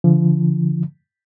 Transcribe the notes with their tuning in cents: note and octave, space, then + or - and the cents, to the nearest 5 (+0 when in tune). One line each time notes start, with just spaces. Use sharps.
D3 -35 F3 -35